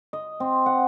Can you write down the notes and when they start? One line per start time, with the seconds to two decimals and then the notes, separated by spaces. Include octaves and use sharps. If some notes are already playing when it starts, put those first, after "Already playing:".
0.13 D#5
0.40 C4
0.66 F#5